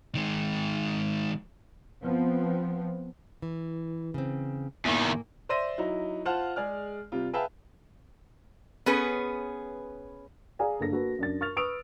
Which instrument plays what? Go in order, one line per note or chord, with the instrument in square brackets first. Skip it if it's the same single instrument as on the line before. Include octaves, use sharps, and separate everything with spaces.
[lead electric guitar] D#3 G#3
[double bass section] F3 B3 C4
[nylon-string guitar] E3
C#3 C4
[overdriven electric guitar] E2 D#3 [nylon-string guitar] A2 A#3 G#5
[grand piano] C5 D5 E5 C6 A#6 D#7
F#3 D#4 E4
F4 C5 F5 F#5 A5 F6
G#3 G#4 D5 F6
C3 G3 F4
G#4 B4 E5 F5 G5 A5
[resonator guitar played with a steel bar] B3 C#4 G#4 B4
[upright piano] G#4 D5 F5 G#5 A#5
G1 A#3 A4 A#6
A#3 F#4 A4 B4
F#2 D4 A6
A#4 C#6 F6 A6 F7
B4 C#6 D#6 E6 D7 F7